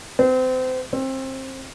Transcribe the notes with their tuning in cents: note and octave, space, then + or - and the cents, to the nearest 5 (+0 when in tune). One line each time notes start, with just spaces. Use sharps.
C4 -30
C4 +25